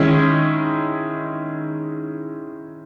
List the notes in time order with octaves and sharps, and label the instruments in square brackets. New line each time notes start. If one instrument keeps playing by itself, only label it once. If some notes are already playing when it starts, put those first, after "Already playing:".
Already playing: [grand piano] D#3 G#3 C#4 E4